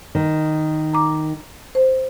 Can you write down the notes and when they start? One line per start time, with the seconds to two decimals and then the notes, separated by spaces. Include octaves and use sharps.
0.15 D#3
0.93 A#5 D6
1.75 C5